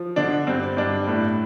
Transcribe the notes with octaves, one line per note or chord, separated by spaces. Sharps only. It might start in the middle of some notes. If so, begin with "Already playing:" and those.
Already playing: F3
D3 D4
G2 C4
G2 D4
A2